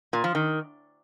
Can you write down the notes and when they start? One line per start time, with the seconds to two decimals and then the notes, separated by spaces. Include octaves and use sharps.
0.13 A#2
0.24 F3
0.35 D#3